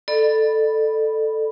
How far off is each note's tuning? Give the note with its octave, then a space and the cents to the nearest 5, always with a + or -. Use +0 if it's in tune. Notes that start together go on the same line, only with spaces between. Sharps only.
A4 +0 D5 +35 B5 +0